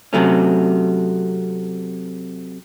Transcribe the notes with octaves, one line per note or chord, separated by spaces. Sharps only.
C3 F#3 A3 C#4